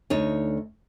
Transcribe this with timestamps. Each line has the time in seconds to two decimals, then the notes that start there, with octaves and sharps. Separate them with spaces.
0.10 D2 D#4 C#5